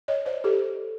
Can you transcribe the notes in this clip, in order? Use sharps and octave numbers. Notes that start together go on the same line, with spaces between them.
C#5 D#5
C5 D5
G4 A4